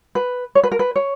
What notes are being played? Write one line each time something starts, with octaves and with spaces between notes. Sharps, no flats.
B4
C#5
B4
A#4
B4
C#5